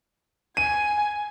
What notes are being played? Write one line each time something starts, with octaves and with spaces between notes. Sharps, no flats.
G#5 D#7